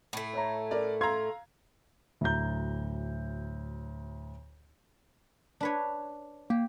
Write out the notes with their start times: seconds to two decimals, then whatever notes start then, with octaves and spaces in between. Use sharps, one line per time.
0.13 A2 A3
0.33 C#5 E5 A#5
0.71 A#4 D5
1.01 F5 A#5 C6 E6 G#6
2.21 D2 A2 F#3 A#5 G6
5.60 D4 B4 C#5
6.50 A#3 G4